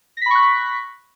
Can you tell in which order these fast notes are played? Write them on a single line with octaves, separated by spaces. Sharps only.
A#6 B6 B5 C#6 F#6